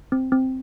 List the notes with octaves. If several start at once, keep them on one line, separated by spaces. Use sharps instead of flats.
C4
C4